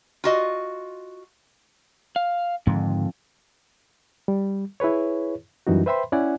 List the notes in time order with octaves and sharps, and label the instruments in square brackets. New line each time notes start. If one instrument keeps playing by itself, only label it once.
[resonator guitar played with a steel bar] F4 F#4 D#5
[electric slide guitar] F5
[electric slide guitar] F2 [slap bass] G#2 D3 D#3
[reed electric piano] G3
E4 G#4 B4 C#5
F#2 E3 G3 D#4 F#4
B4 C5 E5 G5 B5 C6
C#4 E4 D5 F#5 G#5